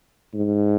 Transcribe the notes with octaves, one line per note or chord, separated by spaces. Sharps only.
G#2